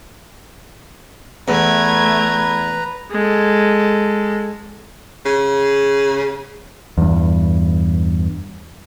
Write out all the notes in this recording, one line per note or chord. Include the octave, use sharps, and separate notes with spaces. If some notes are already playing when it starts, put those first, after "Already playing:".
E2 A3 B4 A#5 G#6
G#3 A4
C#3
E2 G2